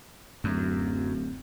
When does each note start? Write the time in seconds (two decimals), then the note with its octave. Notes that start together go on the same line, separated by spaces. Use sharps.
0.44 D1 F#2